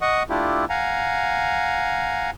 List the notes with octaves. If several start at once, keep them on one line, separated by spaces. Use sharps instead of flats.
D#5 F#5 C#6 D#6
A3 D4 E4 F4 G4
F5 F#5 G#5 A#5